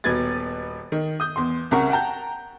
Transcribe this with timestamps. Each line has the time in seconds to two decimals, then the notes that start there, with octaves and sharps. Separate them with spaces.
0.04 D#1 B2 B4 G#6 A6
0.92 D#3
1.20 D#6 G6
1.36 E2 C6
1.71 C2 C#3 A#4 F#5 C#6
1.90 F#5 G5 A5 A#5 G6